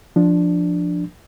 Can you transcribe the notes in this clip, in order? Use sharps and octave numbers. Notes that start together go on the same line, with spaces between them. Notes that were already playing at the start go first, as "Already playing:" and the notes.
F3 D4